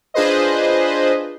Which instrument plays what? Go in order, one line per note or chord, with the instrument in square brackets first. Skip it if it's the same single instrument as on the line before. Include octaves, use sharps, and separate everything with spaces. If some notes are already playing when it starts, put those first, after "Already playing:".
[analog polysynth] D4 F4 G#4 B4 C5 D#5